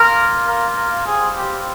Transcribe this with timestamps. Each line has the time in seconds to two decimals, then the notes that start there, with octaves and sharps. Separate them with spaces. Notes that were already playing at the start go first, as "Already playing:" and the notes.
Already playing: A#3 F4 A#4
0.46 A#4
0.76 A#4
1.06 G3 C4 F4 G#4
1.36 G4